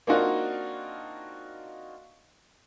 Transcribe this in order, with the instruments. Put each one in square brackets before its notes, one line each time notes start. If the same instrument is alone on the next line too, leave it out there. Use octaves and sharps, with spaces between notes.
[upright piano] A#3 C4 D4 D#4 F4 F#4